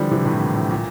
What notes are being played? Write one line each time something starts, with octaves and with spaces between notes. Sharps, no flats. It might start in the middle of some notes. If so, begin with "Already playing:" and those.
Already playing: D3 E3 F3 G3
C3 E3
A2 C3
A#2
A2
A#2